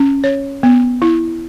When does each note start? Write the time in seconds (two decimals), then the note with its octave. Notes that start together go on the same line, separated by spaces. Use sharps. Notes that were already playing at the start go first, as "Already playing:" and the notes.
Already playing: C#4
0.24 C#5
0.63 B3
1.02 E4